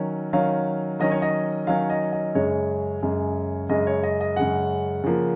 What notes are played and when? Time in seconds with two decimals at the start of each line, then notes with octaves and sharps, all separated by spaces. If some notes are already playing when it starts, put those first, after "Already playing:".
Already playing: D#3 F#3 C#4
0.33 D#3 F#3 C#4 F5
1.00 D#3 F#3 C#4 D#5
1.11 C#5
1.22 D#5
1.67 D#3 F#3 C#4 F5
1.90 D#5
2.13 D#5
2.35 F#2 C#3 G#3 C#5
3.02 F#2 C#3 G#3
3.69 F#2 C#3 G#3 D#5
3.87 C#5
4.03 D#5
4.21 D#5
4.36 F#2 C#3 G#3 F#5
5.04 C#3 F3 A#3